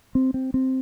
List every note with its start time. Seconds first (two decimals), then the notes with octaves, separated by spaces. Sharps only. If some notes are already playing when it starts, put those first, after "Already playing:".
0.15 C4
0.34 C4
0.54 C4